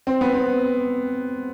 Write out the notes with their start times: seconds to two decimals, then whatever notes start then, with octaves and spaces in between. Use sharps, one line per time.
0.07 C4
0.21 B3
0.34 C4